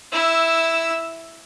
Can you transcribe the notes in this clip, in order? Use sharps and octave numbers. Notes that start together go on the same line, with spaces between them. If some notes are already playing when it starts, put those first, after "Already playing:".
E4 E6